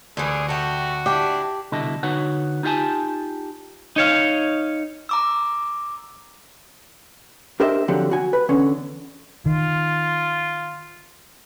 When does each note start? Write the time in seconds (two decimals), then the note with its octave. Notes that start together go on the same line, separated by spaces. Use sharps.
0.17 D2 E3 G3 G#4
0.49 A3 F#4 G4
1.06 D4 E4 G4
1.72 C2 B2 D3 E4 A4 D#5
2.03 D3 D#4 F#4 B4 C#5 F#5
2.63 D#4 F4 G4 E5 G#5 A5
3.96 D#4 C#5 F5
5.09 A#5 D6 E6
7.60 D4 G4 A#4 C5 D#5 E5
7.88 D3 F3 F#3 C4 G4
8.11 F#4 G#5
8.33 B4
8.49 E2 D3 C#4
9.46 D#3 F4